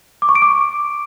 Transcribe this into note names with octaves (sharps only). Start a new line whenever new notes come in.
D6
C#6
D7
D6